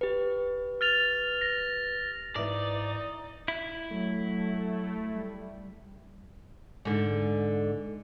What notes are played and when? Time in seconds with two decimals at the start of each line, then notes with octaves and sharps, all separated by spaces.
0.01 G4 B4
0.81 F6 A6 F7
1.41 A#6
2.36 G#2 E3 D#4 E4 D5
3.48 E4
3.91 F#3 A3
5.13 G3
6.85 G#2 D3